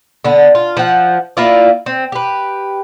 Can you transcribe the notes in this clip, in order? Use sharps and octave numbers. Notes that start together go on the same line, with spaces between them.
D3 B3
F4
F3 F#5
A#3 E4 F4 D5
C4
G4 B4